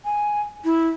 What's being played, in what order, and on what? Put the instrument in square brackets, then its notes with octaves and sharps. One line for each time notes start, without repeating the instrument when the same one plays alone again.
[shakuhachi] G#5
E4